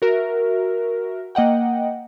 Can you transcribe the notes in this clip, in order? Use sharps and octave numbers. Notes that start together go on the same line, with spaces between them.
F#4 A#4 E5
A#3 D#5 F#5 G5